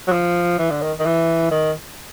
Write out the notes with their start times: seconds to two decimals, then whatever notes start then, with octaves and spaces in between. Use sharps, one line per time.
0.08 F#3
0.12 F3
0.59 E3
0.70 D3
0.82 D#3
0.99 D#3
1.05 E3
1.51 D#3